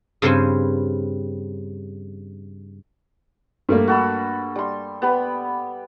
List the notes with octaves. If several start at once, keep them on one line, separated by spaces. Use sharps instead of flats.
G2 C#3 C4 B4 C5 G#5
G2 A3 A#3
F#4 A4 B5
G3 C6
B3 G4 B5